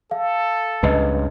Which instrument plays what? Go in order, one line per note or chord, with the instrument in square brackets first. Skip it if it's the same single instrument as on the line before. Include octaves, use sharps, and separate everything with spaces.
[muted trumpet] A4 [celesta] F5
[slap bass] C#2 G2 [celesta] B4 D#5